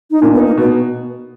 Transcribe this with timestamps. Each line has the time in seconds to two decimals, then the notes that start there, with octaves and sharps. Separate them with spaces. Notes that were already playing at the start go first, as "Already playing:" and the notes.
0.11 D#4
0.22 A#2 D4
0.34 B3
0.39 D#4
0.46 A#3
0.57 B2 B3